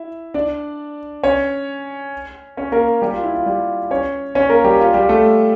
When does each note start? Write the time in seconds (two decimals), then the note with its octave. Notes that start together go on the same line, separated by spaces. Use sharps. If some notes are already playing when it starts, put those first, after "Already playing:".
Already playing: E4 E5
0.34 D4 D5
1.23 C#4 C#5
2.57 C#4 C#5
2.72 A#3 A#4
3.02 G3 G4
3.13 F4
3.23 E4
3.35 F4
3.46 G3 G4
3.91 C#4 C#5
4.35 C#4 C#5
4.49 A#3 A#4
4.64 G3 G4
4.80 F4
4.94 G3 G4
5.09 A3 A4